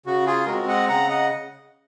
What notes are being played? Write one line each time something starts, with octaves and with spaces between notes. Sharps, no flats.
C#3 F#4
F4 G#4
G#3 C4 F#4 A#4
D#5 F#5
C#3 F#5 A#5
D#5 F#5